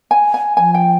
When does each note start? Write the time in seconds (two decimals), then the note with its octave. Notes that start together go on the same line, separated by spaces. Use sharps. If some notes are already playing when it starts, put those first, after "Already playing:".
0.11 G#5
0.34 G#5
0.57 F3 G#5
0.74 G5